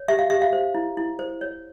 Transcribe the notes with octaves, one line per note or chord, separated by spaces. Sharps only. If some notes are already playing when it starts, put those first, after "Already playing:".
Already playing: C#5
G4 E5
F5
G4 E5
F5
C5
E4
E4
C5
C#5